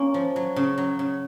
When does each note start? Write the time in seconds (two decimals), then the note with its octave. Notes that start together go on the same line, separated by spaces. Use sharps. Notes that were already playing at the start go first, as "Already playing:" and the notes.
Already playing: A#3 C#4
0.14 F3
0.36 F#3
0.56 C#3
0.78 F#3
0.99 C#3